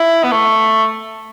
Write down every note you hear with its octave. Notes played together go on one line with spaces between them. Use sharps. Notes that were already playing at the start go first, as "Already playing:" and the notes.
Already playing: E4
B3
A3